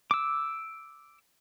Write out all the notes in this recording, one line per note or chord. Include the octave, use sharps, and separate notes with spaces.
D6 E6